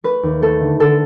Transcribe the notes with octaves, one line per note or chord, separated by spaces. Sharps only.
A3 B4
D#2
A3 A4
D3
D3 A4